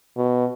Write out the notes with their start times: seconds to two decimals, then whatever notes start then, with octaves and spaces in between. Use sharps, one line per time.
0.17 B2